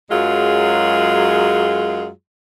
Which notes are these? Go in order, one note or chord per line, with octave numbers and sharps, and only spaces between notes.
F#2 F#3 G#3 F4 G#4